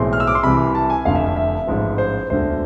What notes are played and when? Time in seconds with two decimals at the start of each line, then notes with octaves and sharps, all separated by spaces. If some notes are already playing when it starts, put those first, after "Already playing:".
Already playing: B1 A2 E3 G#3 C4 C6
0.13 F6
0.20 E6
0.27 D6
0.35 C6
0.43 C2 C3 E3 B5
0.75 A5
0.90 G#5
1.05 F1 F2 D3 F5
1.15 E5
1.26 E5
1.36 E5
1.67 A1 G#2 F3
1.98 C5
2.30 E1 D2 D3 C5